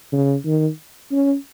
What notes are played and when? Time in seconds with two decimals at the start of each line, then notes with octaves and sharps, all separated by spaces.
0.12 C#3
0.45 D#3
1.11 C#4